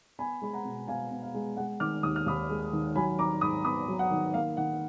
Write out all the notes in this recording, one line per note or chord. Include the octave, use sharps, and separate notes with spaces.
B3 G#5 B5
G#3 B5
F#5 A#5
B2
B2 F5 G#5
B3
F5
G#3
G#3 F#5
D#3 D6 F6
D#2 D#6
F6
D#2 B5 D#6
G#3
D#3
F#3 G#5 B5
D#3 A#5 D6
G#2 B5 D#6
B3 B5 D#6
F#3
F#5
D#3
A#3 F5
D#3 F#5